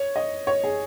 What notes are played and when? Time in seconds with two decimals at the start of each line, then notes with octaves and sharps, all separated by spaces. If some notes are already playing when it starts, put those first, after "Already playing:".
Already playing: C#5
0.16 D#5
0.47 C#5
0.64 G#4